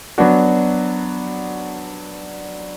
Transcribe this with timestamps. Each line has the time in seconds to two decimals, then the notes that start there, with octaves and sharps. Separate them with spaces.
0.18 F#3 B3 D4 F#4